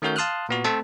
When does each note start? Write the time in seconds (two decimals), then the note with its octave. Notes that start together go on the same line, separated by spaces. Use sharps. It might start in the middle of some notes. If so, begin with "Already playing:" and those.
0.02 D#3 A3 C#4 F#4 A#4 G6
0.16 F5 A5 C6 D#6 F6 F#6
0.49 A#2 B3 F#4
0.64 A3 C4 A4 C5 E5 A5